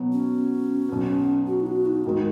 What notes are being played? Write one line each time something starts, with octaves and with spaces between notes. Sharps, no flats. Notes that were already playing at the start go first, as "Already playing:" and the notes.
Already playing: B2 F#3 B3 F#4
C#4
B1 B2 B3
F#4
D#4
F#4
D#4
G#2 D#3 G#3 F#4